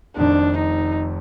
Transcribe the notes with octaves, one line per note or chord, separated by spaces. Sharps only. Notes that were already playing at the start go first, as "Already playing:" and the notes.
F1 F2 D#3 D4
D#4